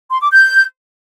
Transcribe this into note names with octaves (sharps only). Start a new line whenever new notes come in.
C6
D6
G6